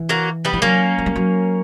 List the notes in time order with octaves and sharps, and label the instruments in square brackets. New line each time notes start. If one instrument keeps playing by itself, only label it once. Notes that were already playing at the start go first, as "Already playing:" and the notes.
Already playing: [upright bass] E3
[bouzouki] F#3 A#3
G3 B3
[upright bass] E3
[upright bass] F#3 [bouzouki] A#3 C#4
[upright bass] F#3
G3
F#3